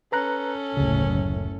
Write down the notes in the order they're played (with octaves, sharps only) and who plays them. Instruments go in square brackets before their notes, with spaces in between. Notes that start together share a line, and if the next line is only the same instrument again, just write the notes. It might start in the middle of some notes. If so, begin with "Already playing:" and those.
[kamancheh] C#4 A4 [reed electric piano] B4 A#5 F#6
[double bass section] F#1 A2 [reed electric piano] D2 C#3